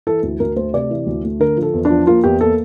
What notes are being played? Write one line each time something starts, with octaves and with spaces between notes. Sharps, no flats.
E3 A4
D2
D2 A#4
A3 C5
C3 D5
E3
D2
A3
D3 A#4
F3
A4
E2
D4
F3
A#3 F4
E2 G4
A#3 A4